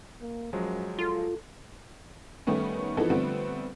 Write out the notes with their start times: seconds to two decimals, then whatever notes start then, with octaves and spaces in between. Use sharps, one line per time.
0.21 A#3
0.53 F#2 F3 F#3 G#3
0.99 F4 A4
2.47 D#3 G3 A3 B3 C#4
2.97 E3 F3 B3 D#4 A4
3.10 D3 F3 G3 A3 B3 C4